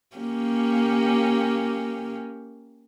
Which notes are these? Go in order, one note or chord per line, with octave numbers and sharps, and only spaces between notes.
A#3 C#4 G4